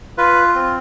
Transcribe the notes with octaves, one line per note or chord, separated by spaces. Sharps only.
F4 B4
C4